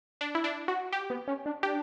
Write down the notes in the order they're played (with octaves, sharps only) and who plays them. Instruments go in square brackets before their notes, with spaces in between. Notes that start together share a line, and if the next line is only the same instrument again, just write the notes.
[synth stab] D4
E4
D4
F#4
G4
[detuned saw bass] B3
C#4
D4
[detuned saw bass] D4 [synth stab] G4